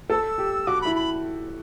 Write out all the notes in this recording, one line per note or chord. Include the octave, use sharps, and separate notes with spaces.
A4 E6
G4
F#4 D6
E4 B5
B5